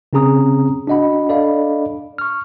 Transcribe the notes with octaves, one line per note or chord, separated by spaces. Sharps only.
C#3 C4 C#4 G#4 A#5 D#6
D4 F#4 D#5 F#5 B5
D4 A4 D5 D#5 F5 B5
C#6 F6